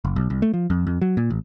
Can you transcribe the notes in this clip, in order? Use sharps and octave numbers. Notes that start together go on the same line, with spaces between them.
F#1
B1
C2
A3
F3
F2
F2
F#3
A#2
A1